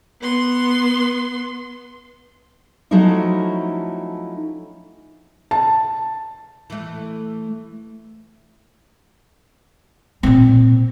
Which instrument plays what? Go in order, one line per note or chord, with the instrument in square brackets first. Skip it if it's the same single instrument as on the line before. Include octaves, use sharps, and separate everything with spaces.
[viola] B3 C6
[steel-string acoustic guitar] F3 F#3 A3 C#4 D#4 E4
[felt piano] A5
[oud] E3 A3
[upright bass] A#2 C4